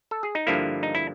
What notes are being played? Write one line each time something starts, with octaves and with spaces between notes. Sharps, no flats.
A4
G#4
D#4
G2 D3 F3 A#3 E4
D#4
E4